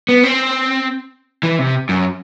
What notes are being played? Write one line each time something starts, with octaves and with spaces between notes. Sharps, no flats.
B3
C4
E3
C3
F#2